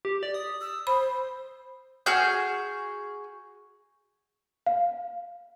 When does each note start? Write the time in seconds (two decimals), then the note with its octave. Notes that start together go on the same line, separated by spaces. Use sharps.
0.05 G4
0.23 D5
0.34 D#6
0.61 E6
0.87 C5 B5
2.06 F#4 G#4 F6 G6
4.66 F5